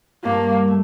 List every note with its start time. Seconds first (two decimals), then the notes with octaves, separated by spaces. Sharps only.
0.24 G2 A#3
0.68 A3